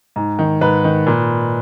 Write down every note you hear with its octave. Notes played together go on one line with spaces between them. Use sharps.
G#2
D#3
G#2 B4
D#3
A#2